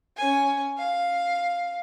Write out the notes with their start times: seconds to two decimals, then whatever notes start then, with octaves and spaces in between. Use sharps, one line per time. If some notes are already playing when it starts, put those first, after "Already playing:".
0.17 C#4 G#5
0.78 F5